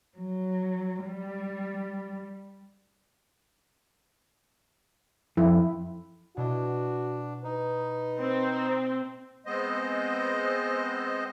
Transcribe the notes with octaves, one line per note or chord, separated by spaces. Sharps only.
F#3
G3
F2 E4
B2 D4 E4 F#4 D#5
D#4 B4
C4
G#3 B3 C4 C5 D#5